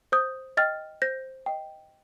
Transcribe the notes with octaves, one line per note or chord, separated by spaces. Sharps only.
C5 D#6 G6
D#5 G5 F6 A6
C5 G6 A#6
D#5 G5